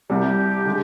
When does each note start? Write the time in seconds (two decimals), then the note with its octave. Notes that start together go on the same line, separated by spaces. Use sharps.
0.10 C2 C3 G3 G4
0.66 D3 G#3